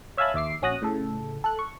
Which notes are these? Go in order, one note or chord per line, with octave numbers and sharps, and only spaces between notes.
C#5 E5 F5 G#5 A5 B5
D#2 E5 D6 C7
A#1 C#4 F#4 D#6 F#6 A#6
A2 C#3 A4
A4 F#6
C#6